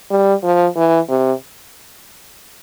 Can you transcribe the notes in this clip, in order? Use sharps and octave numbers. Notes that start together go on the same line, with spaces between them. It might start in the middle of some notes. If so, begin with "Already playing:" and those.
G3
F3
E3
C3